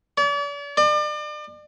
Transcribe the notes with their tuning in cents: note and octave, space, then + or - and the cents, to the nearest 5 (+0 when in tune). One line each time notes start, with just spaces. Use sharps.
D5 -40
D5 +40